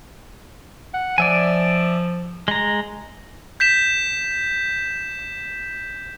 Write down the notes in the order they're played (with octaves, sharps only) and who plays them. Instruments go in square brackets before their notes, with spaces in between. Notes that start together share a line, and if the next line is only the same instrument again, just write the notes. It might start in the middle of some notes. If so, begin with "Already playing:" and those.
[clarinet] F#5
[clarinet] F3 [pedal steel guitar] D5 E5 G#5
[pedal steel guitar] G#3 A#5
[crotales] G6 B6 E7